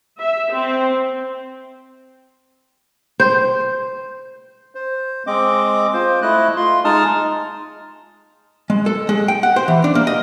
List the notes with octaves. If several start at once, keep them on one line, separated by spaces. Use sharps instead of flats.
E5
C4
C5
C5
G#3 C4 D#5 D6
F4 C5
A3 E4 D#5 F#6
F4 C6
G#3 D#4 A5 D#6 F6
G#3
A4
G#3
G5
F#5
C5
E3
D4
A#3
D#5